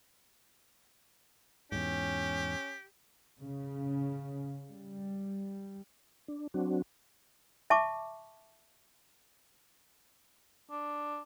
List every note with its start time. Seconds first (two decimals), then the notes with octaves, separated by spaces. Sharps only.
1.72 E2 G#2 C#4 G4
3.41 C#3
4.68 G3
6.28 D4
6.54 F#3 C4 D4 F#4
7.70 E5 A5 C#6 D6
10.71 D4